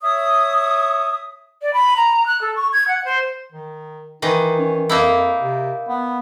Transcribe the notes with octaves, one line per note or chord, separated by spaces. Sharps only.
C#5 E5 D#6
D5
B5
A#5
F#6
A4
C#6
G#6
F#5
C5
D#3
D#3 E3 D#4
C#4
F2 A#3 D#4 E4
C3
B3